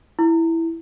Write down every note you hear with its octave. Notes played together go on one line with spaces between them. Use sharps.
E4